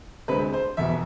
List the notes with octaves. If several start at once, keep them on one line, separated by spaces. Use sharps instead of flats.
D2 C3 G#3 C4 B4
C5
F1 E2 B2 B3 E5